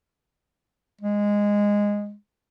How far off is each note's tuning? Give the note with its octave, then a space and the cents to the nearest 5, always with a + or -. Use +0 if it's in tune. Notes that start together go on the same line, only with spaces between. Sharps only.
G#3 -15